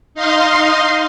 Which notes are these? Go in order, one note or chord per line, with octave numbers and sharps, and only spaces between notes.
D#4 D#5 F5 C6